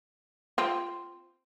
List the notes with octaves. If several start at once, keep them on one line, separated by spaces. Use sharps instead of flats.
C4 F4